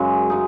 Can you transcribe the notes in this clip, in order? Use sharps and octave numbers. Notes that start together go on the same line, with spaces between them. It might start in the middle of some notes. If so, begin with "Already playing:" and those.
Already playing: F#2 C#3 G#3
G#3 D#4